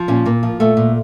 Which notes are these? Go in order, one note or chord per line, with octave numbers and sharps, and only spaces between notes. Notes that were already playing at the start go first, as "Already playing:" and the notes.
Already playing: F3
A#2 C#4
A#2 A#3
F3
A#2 A3
A#2